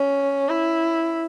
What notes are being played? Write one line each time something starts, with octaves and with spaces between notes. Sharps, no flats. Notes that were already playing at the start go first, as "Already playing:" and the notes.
Already playing: C#4
E4